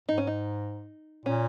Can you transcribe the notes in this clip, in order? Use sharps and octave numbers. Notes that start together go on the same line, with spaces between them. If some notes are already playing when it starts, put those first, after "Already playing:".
G#2 D#4
C#4
D#4
A#2 C#4